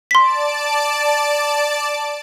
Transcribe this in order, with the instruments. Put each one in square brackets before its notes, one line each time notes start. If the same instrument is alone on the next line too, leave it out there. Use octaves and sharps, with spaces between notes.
[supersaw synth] D5 A5 D7 [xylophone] C6 B6